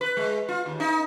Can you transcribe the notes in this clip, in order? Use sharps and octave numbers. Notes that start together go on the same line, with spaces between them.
B4
G#3
F4
D#2
D#4